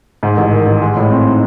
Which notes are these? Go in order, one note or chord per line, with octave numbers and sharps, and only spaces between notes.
G#2
A1
D#3
A1
G#3
A2
C4
D#4